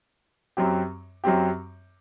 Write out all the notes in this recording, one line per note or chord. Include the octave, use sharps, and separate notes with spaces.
F#2 F#3 C4 G4
F#2 F#3 C4 G4